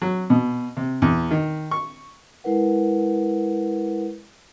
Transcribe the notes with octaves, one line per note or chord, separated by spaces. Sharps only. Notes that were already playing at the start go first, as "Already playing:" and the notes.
F#3
B2
C3
E2
D#3
C#6
G#3 E4 A#4 B4 F#5